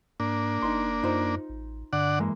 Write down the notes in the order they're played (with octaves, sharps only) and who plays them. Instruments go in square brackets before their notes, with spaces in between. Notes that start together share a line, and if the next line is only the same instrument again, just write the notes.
[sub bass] G#2 [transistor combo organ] A#3 D4
[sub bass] F#1 [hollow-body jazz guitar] D#4 C6
[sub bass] F#2 [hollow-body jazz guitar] D#4 F4 C5
[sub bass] A1
[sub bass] G2 [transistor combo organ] D3 D5 F#5
[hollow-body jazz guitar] E3 G#3 A#3